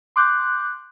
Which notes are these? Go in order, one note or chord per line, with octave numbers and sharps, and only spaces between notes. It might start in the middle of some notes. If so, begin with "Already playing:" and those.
C6 D6 F#6 G6